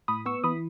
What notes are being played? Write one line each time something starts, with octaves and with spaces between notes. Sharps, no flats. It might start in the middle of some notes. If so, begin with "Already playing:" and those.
A2 B5 D#6
B3 C#6 E6
E3 B5 D#6